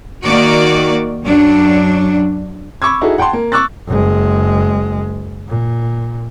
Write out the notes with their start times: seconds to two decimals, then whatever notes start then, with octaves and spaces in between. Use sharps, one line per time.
0.24 D#3 A#3 F#4 D5
1.24 F#2 F#3 D4
2.82 B5 C#6 D6 E6 G#6
3.01 D#4 E4 F#4 G#4 A4
3.18 F#5 G5 A5 C6
3.33 A#3
3.52 C#6 D6 E6 F#6 A6
3.88 F#1 G#3
5.48 A#2